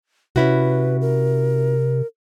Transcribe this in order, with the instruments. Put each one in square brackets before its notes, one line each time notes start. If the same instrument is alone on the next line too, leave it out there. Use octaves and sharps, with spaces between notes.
[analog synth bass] C3 [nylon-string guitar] C#4 E4 F#4 [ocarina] B4
[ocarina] A#4